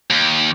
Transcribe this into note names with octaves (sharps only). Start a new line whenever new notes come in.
D#2